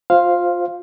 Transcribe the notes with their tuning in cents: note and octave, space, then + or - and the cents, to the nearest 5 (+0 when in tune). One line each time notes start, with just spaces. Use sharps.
F4 +20 C5 +10 F5 +0